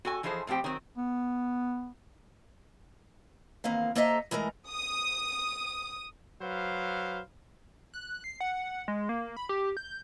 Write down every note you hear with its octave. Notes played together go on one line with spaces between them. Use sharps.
F#4 A4 G#5
E3 F3 D#4 G#4 A4 C5
A2 F3 C4 G4 G5
D#3 F#3 C4
B3
E2 D#3 A#3 C4 F5
A#3 A4 C5 D#5 E5 A#5
E3 G#3 A3 A#4
D#6
F#3 B4 C5 F5
F#6
C7
F#5
G#3
A#3
B5
G4
G6